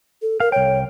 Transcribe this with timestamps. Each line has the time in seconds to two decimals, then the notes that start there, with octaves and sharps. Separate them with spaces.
0.22 A4
0.40 A#4 F5
0.52 C2 C#5 G5